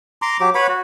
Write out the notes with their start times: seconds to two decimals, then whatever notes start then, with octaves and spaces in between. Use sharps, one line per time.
0.22 A#5 C6 D6
0.40 F#3 G4 D6
0.55 B4 C#5 F#5 B5
0.69 F#4